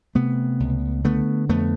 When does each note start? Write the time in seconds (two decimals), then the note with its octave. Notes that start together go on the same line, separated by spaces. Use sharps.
0.15 C3 A3 B3
0.60 C#2
1.04 D3 A3 B3
1.49 F2 A3 B3